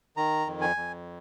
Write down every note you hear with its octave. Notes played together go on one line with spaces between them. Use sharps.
D#3 A#5
F2
G#5
F2